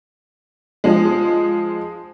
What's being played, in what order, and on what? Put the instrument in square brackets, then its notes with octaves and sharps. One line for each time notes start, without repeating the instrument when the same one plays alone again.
[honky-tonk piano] F3 G#3